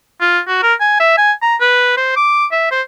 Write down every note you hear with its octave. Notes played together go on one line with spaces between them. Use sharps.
F4
F#4
A#4
G#5
E5
G#5
A#5
B4
C5
D6
E5
C5